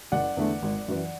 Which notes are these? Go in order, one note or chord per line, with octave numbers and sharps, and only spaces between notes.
F#1 D5 F#5
E2 D3 A3
G#1
F#2 E3